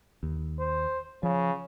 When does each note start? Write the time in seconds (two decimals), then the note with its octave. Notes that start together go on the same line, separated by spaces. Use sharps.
0.23 D#2
0.59 C5
1.23 C#3 F3